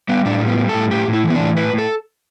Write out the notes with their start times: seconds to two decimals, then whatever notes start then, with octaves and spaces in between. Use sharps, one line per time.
0.09 G3 B3
0.25 A2 D4
0.42 G3
0.48 B3
0.59 G3
0.69 A4
0.74 A2
0.91 A2 G4
1.07 A2
1.13 E4
1.24 E3
1.30 B3
1.35 D4
1.40 A2
1.57 A2 B4
1.73 A2
1.78 A4